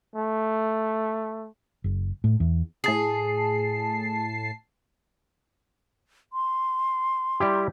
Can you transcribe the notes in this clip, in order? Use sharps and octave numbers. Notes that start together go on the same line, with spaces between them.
A3
F#1
A2
E2
A2 G#4 A5 C7
C6
G3 E4 G4